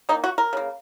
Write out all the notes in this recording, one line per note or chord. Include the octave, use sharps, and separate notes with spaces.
D#3 A#3 D#4
F#4
A#4
C#3 A#3